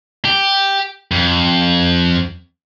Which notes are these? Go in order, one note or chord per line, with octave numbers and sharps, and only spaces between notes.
G4
F2